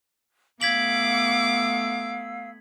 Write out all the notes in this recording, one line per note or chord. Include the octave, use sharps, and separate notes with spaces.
A3 B3 F5 D6 E6 G#6 B6 F#7